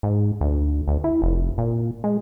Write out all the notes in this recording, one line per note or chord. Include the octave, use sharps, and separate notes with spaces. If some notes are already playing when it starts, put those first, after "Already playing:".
G#2
D2
D2
E4
F1
A#2
G#3